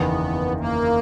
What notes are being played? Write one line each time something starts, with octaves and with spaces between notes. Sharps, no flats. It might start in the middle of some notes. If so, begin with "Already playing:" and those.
Already playing: F#1 E2 D#3 B3
A#3